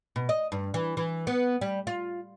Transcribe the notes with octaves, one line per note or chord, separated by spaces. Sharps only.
B2
D#5
G2
E3
E3
B3
G3
F4